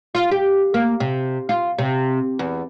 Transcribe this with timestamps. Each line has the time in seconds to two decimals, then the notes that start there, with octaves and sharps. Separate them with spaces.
0.15 F4
0.31 G4
0.74 A#3
1.00 C3
1.49 F4
1.78 C3
2.39 E2